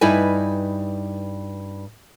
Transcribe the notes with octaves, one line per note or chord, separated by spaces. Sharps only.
G2 D#4 E4 B4 G#5